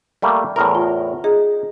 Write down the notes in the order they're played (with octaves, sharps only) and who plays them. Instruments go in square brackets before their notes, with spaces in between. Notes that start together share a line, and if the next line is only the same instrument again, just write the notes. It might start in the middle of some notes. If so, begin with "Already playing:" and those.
[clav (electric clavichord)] G3 A3 A#3
E2 A2 A#4
[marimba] F4
[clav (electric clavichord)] D#4 [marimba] G#4